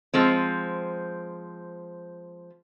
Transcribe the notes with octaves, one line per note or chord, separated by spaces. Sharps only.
F3 G#3 C4